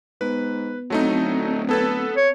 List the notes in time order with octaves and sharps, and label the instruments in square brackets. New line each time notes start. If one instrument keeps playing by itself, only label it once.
[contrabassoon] G#2 [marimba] B3 [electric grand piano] B4
[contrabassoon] D1 [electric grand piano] F#3 A3 D#4 [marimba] C4
[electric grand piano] B3 A4 B4 [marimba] A5 G#6 A6
[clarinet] C#5